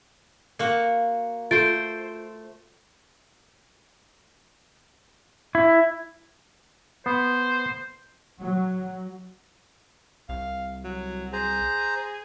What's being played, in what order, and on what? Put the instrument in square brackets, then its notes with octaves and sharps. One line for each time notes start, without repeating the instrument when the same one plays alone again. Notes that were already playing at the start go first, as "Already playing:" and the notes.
[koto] A#3 F#4
[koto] A3 C5 [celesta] F4 A6 D7
[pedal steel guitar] E4
[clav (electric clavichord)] B3 [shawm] C5
[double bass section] F#3
[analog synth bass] C2 [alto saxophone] F5
[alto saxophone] F#3
[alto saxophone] G#4 [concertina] C5 A#5